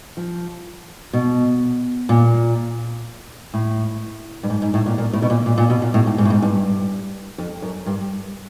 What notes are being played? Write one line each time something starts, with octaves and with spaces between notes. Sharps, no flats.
F3
B2
A#2
A2
G2
G#2
G#2
A2
A#2
A#2
A2
B2
A#2
A#2
A#2
B2
A#2
A2
G#2
G#2
A2
G#2
G2
F2
F#2
G2